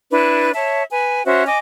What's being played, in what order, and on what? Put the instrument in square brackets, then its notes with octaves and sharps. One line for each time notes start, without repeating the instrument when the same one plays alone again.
[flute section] D4 E4 B4
C#5 E5 A5
B4 G#5
C#4 F#4 C5 E5
D#5 G#5 D6